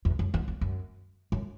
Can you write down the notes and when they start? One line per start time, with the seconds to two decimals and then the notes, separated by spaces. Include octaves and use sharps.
0.05 E2
0.19 F#2
0.34 E2
0.48 E2
0.61 F#2
1.32 F#2